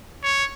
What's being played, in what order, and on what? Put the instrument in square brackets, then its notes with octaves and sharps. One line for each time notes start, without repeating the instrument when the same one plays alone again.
[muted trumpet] C#5